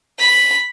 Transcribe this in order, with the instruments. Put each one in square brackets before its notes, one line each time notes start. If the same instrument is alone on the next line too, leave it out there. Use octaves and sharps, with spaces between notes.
[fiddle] B5